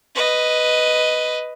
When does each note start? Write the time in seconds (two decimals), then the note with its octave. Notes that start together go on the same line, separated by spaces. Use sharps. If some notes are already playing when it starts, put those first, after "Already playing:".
0.15 B4 D#5